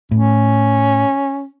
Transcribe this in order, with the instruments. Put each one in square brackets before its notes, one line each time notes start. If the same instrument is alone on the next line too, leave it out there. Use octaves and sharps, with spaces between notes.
[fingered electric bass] A2 [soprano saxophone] C#4